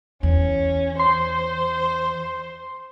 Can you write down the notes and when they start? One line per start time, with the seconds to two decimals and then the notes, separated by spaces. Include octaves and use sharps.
0.23 E2 C#4
0.99 C5 C6